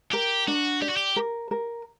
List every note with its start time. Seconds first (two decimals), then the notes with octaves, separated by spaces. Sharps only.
0.12 G4 A#4
0.48 D4 F#4
0.82 G4 D5
0.89 F#4
0.97 G4
1.16 A#4
1.51 A#4